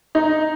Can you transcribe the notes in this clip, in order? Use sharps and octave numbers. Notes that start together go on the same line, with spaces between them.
D#4